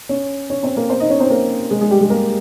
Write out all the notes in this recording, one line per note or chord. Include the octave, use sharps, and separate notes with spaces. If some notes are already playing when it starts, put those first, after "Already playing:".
C#4 C#5
C#4 C#5
C4 C5
A#3 A#4
C4 C5
D#4 D#5
C#4 C#5
C4 C5
A#3 A#4
G#3 G#4
G#3 G#4
G3 G4
G#3 G#4
A#3 A#4